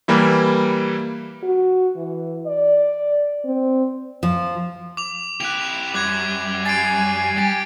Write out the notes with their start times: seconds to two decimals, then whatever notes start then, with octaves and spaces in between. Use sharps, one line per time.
0.08 E3 G3 A#3 E4
1.43 F#4
1.96 E3
2.47 D5
3.44 C4
4.23 F3
4.97 D6 F7
5.40 E4 G4 F#6 F7
5.94 F#2 G3 D6 F#6 G#6
6.65 G#5 A6 C7 D7
7.37 G4 A6